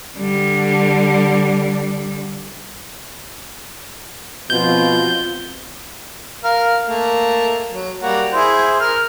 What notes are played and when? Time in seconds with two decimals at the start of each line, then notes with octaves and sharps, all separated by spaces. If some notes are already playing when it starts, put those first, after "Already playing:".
0.18 D3 G3
4.50 B2 F3 C4 F4 G6
6.44 A#4 F5
6.87 A3 A#3
7.72 F#3
8.02 G3 A#3 F#4
8.32 E4 G#4 C5
8.80 A#4 F6